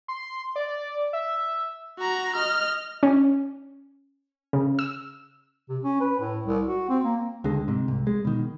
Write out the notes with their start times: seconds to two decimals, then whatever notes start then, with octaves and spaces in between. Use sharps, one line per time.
0.08 C6
0.56 D5
1.13 E5
1.99 F#4 A#5
2.36 D#5 F6
3.03 C#4
4.53 C#3
4.79 E6
5.69 C3
5.83 C#4
6.00 B4
6.19 A2
6.46 C2
6.67 F#4
6.89 C4
7.04 A#3
7.44 C#2 D3 G#3
7.68 G#2 C3
7.88 C2
8.07 G#3
8.25 B2 D#3